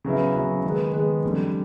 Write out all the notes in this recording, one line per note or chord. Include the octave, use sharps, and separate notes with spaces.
C#3 F#3 B3 E4
C#3 F#3 B3 E4
D#3 G#3 B3
D#3 G#3 B3
F2 D3 G3